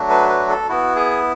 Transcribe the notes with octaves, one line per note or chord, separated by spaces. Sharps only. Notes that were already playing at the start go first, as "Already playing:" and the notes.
Already playing: F#3 A3 D4 F#4
B4
B4
A4
B3 E4 F#4
G#4